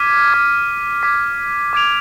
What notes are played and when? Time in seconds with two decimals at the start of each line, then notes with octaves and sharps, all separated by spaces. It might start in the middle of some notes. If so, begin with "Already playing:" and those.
Already playing: D6 F6 G#6 B6 D#7
0.33 D6 G#6 B6
1.03 D6 G#6 B6
1.73 D6 G#6 D7 F7